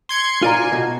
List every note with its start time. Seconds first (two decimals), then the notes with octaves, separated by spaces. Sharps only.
0.09 C6 G#6 C#7
0.42 F4 D5 G#5 A#5
0.72 B2 F#4